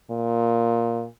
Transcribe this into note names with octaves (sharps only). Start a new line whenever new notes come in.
A#2